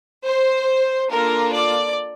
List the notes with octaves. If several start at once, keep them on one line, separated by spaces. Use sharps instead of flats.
C5
A#3 D4 F4 A4 A#4
D5